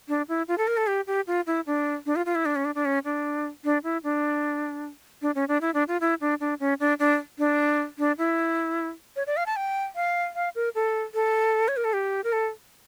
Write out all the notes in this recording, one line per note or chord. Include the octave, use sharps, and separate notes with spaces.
D4
E4
F4
A4
A#4
A4
G4
G4
F4
E4
D4
D4
F4
F4
E4
D4
C#4
D4
D4
C#4
D4
D4
E4
D4
D4
C#4
D4
E4
D4
F4
E4
D4
D4
C#4
D4
D4
D4
D4
E4
C#5
D5
F5
A5
G5
F5
F5
A#4
A4
A4
C#5
A#4
A4
G4
A#4
A4